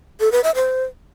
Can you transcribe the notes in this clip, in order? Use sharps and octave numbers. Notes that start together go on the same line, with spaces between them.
A4
B4
E5
C5